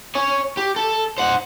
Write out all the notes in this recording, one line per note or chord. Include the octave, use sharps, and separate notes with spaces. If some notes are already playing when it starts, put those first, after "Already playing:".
C#5 G#5
G4
A4
C5 F#5